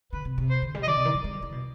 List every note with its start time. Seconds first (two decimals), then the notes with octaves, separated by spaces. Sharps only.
0.13 D3 B4
0.25 C3
0.38 C3
0.49 C5
0.62 D3
0.75 G3
0.83 D#5
0.87 D#3 D5
0.96 C3
1.05 D#3
1.15 F3
1.24 G#3
1.33 G3
1.42 D3
1.52 B2